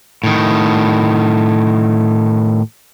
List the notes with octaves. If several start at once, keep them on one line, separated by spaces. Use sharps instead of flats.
A2 D#3